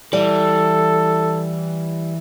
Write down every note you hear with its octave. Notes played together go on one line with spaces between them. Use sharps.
E3 G3 A4